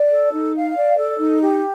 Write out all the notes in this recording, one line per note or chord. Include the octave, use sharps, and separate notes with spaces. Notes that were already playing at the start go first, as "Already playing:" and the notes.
Already playing: D5
A4
D#4
F5
D5
A4
D#4
G4